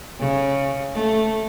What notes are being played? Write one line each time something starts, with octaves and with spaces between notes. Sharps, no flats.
C#3
A3